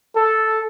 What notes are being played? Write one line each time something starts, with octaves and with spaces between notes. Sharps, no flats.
A4